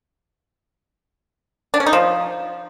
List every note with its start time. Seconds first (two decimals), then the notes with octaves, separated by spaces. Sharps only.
1.74 D4
1.80 C#4
1.86 D#4
1.93 F3